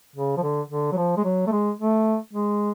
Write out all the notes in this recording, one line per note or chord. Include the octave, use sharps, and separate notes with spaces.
C#3
F3
D3
D3
F#3
F3
G#3
F#3
A3
G#3
A3
G#3